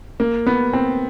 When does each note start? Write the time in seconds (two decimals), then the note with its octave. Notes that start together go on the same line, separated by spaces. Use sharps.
0.20 A#3
0.47 B3
0.73 C4